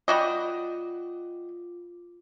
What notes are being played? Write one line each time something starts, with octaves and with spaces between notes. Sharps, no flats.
G3 F4 F#4 D#5 D6